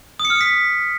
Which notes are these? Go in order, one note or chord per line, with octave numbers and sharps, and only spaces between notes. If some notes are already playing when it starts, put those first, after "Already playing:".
D#6
C#7
F6
D#6
B6